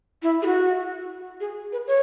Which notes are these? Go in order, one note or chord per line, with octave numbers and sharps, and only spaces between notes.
E4
G#4
F#4
G#4
B4
C#5